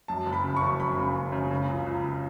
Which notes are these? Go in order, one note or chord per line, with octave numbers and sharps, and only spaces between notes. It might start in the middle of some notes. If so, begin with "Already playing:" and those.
F#2 A5
F#1
B5
C#3
F#1 C#6
F#2 B5
C#3
F#1
C#3
C#3
C#2
C#2
C#2